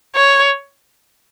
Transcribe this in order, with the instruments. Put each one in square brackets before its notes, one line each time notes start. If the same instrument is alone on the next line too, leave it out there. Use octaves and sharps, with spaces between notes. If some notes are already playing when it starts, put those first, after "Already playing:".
[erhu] C#5